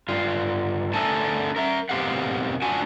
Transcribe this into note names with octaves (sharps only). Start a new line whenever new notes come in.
G2 F4
A3 D4 A4 A#4 G#5 A5
A#4 E5
B2 C4 G4 A#4 F5 F#5
D4 F4 F#4 F#5 G#5